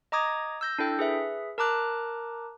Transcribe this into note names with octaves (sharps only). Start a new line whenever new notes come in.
D#5 A#5 D6 D#6 G#6
E6 G6 A#6
D4 E4 A4 G5
G#4 B4 E5
A#4 A5 A#5 D6 F#6